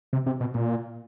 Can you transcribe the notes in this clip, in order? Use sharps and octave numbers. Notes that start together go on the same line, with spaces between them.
C3
C3
B2
A#2